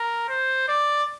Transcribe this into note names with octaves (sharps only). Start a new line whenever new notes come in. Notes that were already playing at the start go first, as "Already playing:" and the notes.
Already playing: A#4
C5
D5